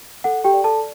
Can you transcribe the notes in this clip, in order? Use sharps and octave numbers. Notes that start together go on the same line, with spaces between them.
A4 F#5
G4 G5
D5
A4 A5